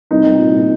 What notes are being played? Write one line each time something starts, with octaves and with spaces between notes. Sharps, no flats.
C2 D#4
C2
A#2
A#2